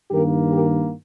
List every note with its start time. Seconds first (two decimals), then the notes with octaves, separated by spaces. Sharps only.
0.10 G2 D#3 A#3 G4 A#4
0.52 G4 A#4